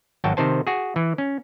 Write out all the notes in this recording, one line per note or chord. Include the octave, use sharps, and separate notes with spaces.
G#1 F#3 F#4 G5 A5
C3 D#3 C5 A5
F#4 G#4
E3
C#4